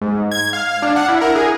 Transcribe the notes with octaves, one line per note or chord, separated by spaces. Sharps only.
G#2
G#6
F5
D4
F#5
E4
A#4
G#4